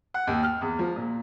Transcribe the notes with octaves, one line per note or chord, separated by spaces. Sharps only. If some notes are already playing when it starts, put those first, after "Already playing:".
F#5
D#2
F6
E2
F3
A#2